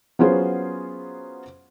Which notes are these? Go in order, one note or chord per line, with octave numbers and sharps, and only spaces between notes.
F#3 B3 C#4 F4 G#4 C5